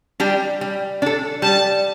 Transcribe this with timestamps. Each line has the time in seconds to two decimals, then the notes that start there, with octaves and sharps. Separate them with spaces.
0.20 G3 D4 G4
0.61 G3
1.02 D4 A4
1.42 G3 A5